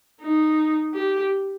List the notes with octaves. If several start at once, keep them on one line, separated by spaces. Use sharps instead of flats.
D#4
G4